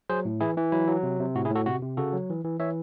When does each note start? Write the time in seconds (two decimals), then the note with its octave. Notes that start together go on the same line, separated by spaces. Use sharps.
0.09 F#3 G#4 C5
0.25 A2
0.40 E3 E4 G#4
0.57 E3
0.72 F#3 E4
0.88 F#3
1.03 C3
1.20 C3
1.36 A2 F#4
1.45 E4 G#4
1.50 A2
1.55 F#4 A4
1.66 C3 F#4
1.82 C3
1.97 C#3 F#4 A4
2.13 F#3
2.30 E3
2.44 E3
2.60 E3 C#5 E5